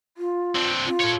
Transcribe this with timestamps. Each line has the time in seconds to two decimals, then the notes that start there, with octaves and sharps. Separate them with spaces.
0.17 F4
0.55 C4 D4
0.86 F4
1.01 A4 C#5